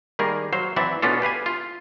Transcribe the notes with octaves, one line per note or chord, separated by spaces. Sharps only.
D#3 G3 A#3 G#4 A#4
F#3 C5 F5
E3 F#3 C4 F#4 D5 E5
B2 B3 C#4 D4 F4 A4
G4 B4 F5 G#5
F4